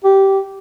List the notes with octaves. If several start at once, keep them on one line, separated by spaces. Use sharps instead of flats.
G4